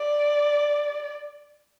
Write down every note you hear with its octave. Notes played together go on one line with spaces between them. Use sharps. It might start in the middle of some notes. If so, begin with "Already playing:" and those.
Already playing: D5